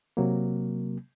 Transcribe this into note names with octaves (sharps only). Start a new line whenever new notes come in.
C3 F#3 A#3